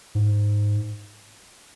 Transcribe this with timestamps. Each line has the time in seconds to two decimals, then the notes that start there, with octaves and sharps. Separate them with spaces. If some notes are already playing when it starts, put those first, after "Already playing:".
0.15 G#2